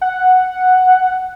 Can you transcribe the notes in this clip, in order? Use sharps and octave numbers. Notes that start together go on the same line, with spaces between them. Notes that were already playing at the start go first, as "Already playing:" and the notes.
F#5